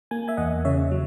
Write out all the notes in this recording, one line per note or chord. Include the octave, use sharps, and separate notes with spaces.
A#3 G#5
E5 G#5
E2 D#5 F#5
C#3 C#5 E5
F#3